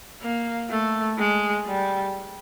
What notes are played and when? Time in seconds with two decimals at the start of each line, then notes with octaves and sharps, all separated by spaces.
0.22 A#3
0.70 A3
1.18 G#3
1.66 G3